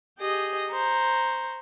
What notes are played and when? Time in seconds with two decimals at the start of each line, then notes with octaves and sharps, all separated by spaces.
0.18 G4 G#4 D#5
0.69 C5 A#5 C#6